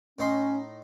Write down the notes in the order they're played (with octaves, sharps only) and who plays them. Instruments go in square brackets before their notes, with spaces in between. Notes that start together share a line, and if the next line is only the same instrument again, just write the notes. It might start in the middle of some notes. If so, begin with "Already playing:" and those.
[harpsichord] A2 D#4 C6 [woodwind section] C#4